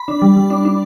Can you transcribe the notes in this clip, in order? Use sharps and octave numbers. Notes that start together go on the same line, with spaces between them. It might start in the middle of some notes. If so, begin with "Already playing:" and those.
Already playing: B5
D4
G3
G3
D4
D4